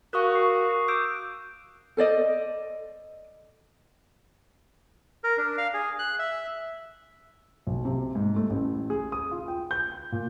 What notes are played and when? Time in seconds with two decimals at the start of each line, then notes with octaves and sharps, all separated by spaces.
0.13 F#4 A#4 F5 C#6 D#6 F#6
0.35 C7
0.88 D6 E6 G6 D7
1.97 A4 C5 D5 D#5
5.24 A#4
5.38 D4
5.58 F5
5.74 G#4
5.99 F#6
6.19 E5
7.67 B1
7.85 C3
8.15 G#2
8.36 A3
8.50 A1
8.90 G#4
9.12 D#6
9.31 F4
9.48 G5
9.71 G6
10.12 A#2